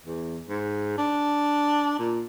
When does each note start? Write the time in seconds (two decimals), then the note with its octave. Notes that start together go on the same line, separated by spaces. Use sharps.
0.05 E2
0.49 G#2
0.98 D4
1.99 A#2